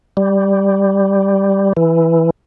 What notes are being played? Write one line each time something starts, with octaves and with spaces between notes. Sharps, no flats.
G3
E3